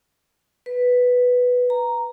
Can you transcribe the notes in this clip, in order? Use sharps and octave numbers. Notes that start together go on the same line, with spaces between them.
B4
A#5